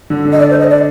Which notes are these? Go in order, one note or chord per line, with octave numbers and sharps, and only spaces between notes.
D3
D3
D#5
D5
C5
D#5
D5